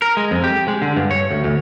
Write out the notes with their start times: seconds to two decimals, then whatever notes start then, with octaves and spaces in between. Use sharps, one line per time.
0.02 A#4
0.17 G#3
0.31 F2
0.44 G4
0.68 G#3
0.82 D3
0.96 G2
1.11 C#5
1.31 D2
1.44 D2